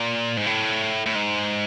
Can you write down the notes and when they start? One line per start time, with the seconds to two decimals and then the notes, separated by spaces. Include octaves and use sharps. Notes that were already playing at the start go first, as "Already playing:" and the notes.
Already playing: A#2
0.37 G#2
0.46 A2
1.06 A2
1.15 G#2